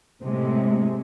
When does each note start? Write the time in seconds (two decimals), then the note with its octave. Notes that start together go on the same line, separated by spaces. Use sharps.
0.23 A2 C3 G#3